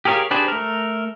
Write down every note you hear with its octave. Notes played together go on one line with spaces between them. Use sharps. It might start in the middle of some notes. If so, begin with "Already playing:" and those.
G4 G#4 A#4 C#5 F5
D4 G4 G#4 B4 C5
A3 A#4